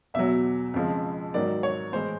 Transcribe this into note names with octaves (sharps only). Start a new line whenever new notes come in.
E2 B2 F#3 E5
F2 C#3 F3 G#3
G#2 D#3 F#3 D5
C#5
A2 E3 G#3 C5